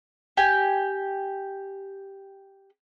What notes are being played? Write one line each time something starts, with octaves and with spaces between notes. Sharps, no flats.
G4 G#5